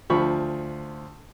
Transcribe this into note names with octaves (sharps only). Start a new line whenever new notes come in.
D2 F3 B5 C#6